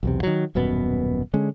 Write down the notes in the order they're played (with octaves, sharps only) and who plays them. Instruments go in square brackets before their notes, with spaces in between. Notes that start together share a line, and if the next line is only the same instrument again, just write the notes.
[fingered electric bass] B1 E2 C3
D#3 F#3
D#1 F#2 B2 B3
D3 G#3 C#4